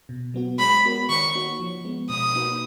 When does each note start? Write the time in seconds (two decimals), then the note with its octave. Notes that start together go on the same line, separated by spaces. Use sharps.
0.09 B2
0.34 F#3 B3 F#4
0.59 G#3 B5
0.85 B3 F#4 A#4 C#5
1.09 D#3 C#6
1.35 A#3 D#4 F#4 C#5
1.60 F3
1.85 G#3 B3
2.10 B2 D#6
2.35 A#3 D#4 F#4 B4